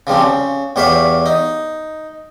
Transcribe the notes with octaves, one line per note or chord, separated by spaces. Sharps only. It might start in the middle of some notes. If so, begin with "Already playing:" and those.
C#3 F3 G3 C4
C#3
E2 G3 C#5 E5 F5 B5
D#4